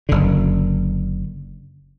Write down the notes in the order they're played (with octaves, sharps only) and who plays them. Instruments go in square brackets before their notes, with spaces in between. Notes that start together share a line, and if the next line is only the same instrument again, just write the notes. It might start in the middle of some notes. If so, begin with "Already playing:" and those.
[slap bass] F#1 D3